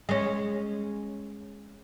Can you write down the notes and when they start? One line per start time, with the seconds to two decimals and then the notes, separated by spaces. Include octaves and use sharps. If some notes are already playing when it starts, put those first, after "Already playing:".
0.09 G#3 C#4